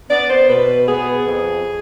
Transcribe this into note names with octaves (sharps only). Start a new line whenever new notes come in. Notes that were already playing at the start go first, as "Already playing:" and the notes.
B3 D5
C5
B2 B4
B3 G#4
F2